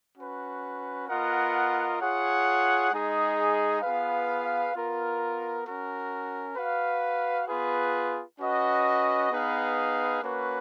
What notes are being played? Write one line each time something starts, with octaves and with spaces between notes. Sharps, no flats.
C#4 F#4 B4
B3 F4 A#4 D#5 F#5
F4 G#4 C#5 F#5
G#3 D#4 G#4
B3 F4 G#4 B4 F5
B3 F4 A#4
C#4 F#4 A#4
F#4 B4 F5
B3 F4 G#4 B4
C#4 F#4 B4 D#5 F#5
B3 D#4 G#4 B4 F5
A#3 C#4 F#4 B4